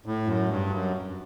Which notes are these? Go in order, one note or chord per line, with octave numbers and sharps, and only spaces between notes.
A2
F#2
G2
F#2